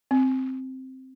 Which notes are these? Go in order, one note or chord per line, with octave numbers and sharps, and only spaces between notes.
C4